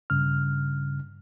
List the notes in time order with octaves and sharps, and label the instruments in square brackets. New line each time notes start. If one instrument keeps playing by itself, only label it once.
[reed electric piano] G2 C#3 F6